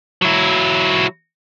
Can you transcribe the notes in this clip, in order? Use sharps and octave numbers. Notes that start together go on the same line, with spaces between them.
F#3 E4